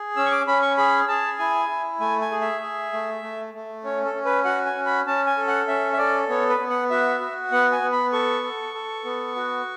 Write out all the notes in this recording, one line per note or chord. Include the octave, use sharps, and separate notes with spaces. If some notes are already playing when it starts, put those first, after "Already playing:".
Already playing: G#4
C#4 E6
C#6
D6
C#4 B5
C#6
G#4 B5
G#4 A5
E4 G#5
E4
A3 G#5
G#5
G#4
E5
G#4
A3
A3
A3
C#4 C#5
A4
C#4
B4
F#4 F#5
G#5
C#4
B5
C#4 A5
G#5
A4
F#5
C#4 E5
E5
A4 D5
B3 C#5
B4
B3
F#5
F#4 E5
F#4
B3 F#5
G#5
B3
B5
A4 C#6
A4
A4
B3
F#4